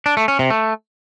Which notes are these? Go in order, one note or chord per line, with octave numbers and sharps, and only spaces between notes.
D4
A3
C#4
C3
A3